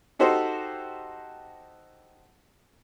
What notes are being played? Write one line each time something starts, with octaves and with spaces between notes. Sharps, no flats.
D#4 F#4 G4 A4 C5 D#5